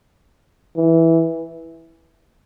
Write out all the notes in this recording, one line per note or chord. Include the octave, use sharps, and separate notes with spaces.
E3